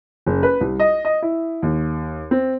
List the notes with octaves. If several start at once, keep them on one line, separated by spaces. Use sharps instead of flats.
F#1
B4
C2
D#5
D#5
E4
D#2
C4